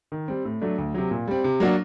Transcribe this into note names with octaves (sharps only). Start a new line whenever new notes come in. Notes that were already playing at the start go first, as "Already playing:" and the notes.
D#3
G3 C4
A2
F#3 A3 D4
D2
C3 F#3
A#2
G3 C4
C3
F#3 A#3 D4 F#4